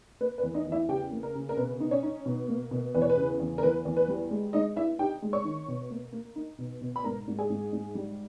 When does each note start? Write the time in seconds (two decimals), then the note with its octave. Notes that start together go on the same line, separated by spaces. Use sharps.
0.21 A#3 B4
0.38 B4
0.43 E2
0.54 D#4 D#5
0.66 E2
0.72 E4 E5
0.88 C#3 G4 G5
1.12 A#3
1.23 A#4
1.35 C#3
1.49 A#4
1.57 B2 B4
1.80 D#4
1.91 C#4 C#5
2.03 D#4
2.26 B2
2.48 A#3
2.71 B2
2.94 E2 B4
3.02 C#5
3.10 B4
3.17 C#3
3.40 E2
3.58 A#4
3.62 E2 B4
3.85 E2
3.97 B4
4.08 G3
4.31 G#3
4.53 G#3 D#4 D#5
4.76 G2 E4 E5
4.99 D#4 G4 G5
5.22 G#3
5.33 C#5 C#6
5.45 D#3
5.68 B2
5.90 A#3
6.12 A#3
6.36 D#4
6.58 B2
6.81 B2
6.96 B5
7.04 G#2 A#4 A#5
7.28 G#2
7.38 G#4 G#5
7.50 G#2
7.73 G#2
7.95 G3